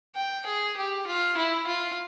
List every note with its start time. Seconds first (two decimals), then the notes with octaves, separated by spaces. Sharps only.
0.15 G5
0.46 G#4
0.76 G4
1.07 F4
1.37 E4
1.67 F4